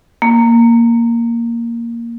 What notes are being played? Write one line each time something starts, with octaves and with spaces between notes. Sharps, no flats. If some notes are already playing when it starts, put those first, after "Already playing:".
A#3